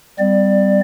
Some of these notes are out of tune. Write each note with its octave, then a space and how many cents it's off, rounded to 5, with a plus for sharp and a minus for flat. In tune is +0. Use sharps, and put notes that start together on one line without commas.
G3 +0 C4 -40 D5 +15